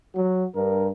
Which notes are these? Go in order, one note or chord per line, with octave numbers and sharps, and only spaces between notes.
F#3 F#4
G2 A#4